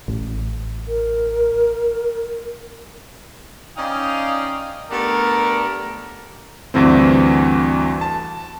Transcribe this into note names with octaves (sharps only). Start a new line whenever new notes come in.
A1
A#4
C#4 D#4 D5 D#5 F5 G5
A3 B3 D4 G4 A#4
D2 G2 E3 C4
A5